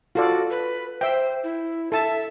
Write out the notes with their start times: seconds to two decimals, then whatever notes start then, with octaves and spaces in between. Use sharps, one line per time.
0.15 F4 F#4 A4 D5
0.51 B4
1.01 C5 E5 G5
1.44 E4
1.92 A4 E5 A5